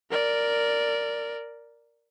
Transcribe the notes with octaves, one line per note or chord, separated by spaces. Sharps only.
A#4 D5